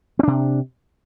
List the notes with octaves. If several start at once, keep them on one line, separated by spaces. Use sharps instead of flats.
C3 C4 D4